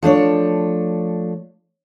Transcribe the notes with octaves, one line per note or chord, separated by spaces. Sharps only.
F3 A3 D4 C#5